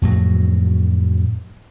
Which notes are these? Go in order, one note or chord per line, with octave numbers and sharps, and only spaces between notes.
F2 A2 F#3